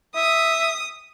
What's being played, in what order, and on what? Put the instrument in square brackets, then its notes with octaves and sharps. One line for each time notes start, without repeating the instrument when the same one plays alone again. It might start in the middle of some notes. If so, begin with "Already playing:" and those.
[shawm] E5 [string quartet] D#6